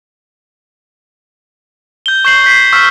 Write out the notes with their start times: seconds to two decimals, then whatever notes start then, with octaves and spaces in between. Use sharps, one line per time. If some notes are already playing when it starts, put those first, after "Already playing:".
2.06 G6 G7
2.25 C#6 G6 C7 F#7
2.44 G6 B6 C7
2.72 C#6 E6 F6 B6